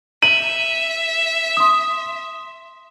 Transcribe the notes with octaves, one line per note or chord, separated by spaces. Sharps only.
E5 D#7 F#7
C6 D#6